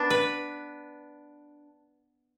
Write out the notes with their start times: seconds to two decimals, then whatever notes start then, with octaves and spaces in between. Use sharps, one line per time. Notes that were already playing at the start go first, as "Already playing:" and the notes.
Already playing: B3 D4
0.10 B4